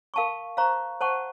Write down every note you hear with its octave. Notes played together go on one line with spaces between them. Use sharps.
A#4 F5 A5 C#6
C5 F5 A#5 C#6
C5 F#5 A5 C#6